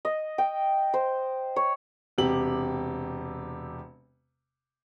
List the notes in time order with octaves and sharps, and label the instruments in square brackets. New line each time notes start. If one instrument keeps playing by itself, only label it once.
[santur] D#5
G5
C5
C#5
[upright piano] E1 C3 G4 F#7